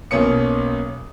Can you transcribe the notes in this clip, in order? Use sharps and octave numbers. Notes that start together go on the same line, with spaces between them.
B1 B2 A#3 C#4 D#6 C#7